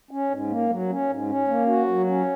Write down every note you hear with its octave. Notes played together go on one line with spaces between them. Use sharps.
C#4
G#2
A#3
F#3
C#4
G#2
C#4
A#3
F#4
F#3
C#4